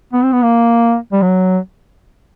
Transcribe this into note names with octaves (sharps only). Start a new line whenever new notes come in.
B3
C4
B3
A#3
G3
F#3